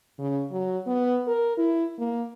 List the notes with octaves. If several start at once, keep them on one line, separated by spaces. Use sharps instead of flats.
C#3
F#3
B3
A#4
E4
A#3